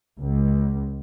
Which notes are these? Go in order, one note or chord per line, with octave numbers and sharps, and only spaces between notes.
C#2